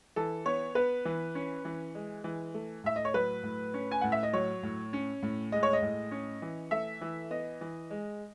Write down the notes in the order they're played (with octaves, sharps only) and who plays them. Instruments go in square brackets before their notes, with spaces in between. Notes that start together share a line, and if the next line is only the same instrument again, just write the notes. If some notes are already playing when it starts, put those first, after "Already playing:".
[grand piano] E3 A4
B3 C#5
B3 B4
E3
C#4
E3
G#3
E3
A3
A2 E5
D#5
C#5
F#3 B4
A2
C#4
G#5
A2 F#5
E5
D#5
F#3 C#5
A2
C#4
A2
G#3 D#5
C#5
D#5
A2
C#4
E3
A3 E5
E3
B3 D#5
E3
G#3